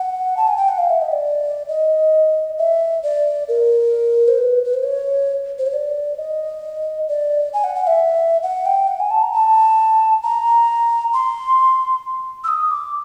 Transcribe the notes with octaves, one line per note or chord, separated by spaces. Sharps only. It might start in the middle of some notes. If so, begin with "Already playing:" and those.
Already playing: F#5
A5
G#5
G5
F#5
F5
E5
D#5
D5
D#5
E5
D5
A#4
C5
B4
B4
C5
C#5
C5
C#5
D5
D#5
D5
G#5
F#5
F#5
E5
F#5
G5
F#5
G#5
A5
A#5
A5
A#5
C6
E6
D#6
D6